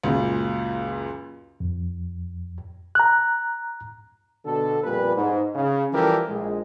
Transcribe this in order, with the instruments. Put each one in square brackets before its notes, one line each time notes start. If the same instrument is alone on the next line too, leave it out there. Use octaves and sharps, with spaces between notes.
[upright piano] C#2 F#2 A#2
[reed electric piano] F2
A#5 F#6
[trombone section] B2 D3 A4
F2 A#2 G3 B4
G#2
C#3
E3 F3 G3 G4 A4 A#4
A#1 G#3